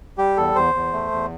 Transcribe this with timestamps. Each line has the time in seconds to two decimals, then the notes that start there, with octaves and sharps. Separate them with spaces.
0.18 G3 G4
0.37 E2 A4
0.55 E2 C5
0.74 E2
0.93 A3
1.12 E2